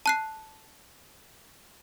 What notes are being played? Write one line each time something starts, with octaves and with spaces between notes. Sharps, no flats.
A5 F#6 C7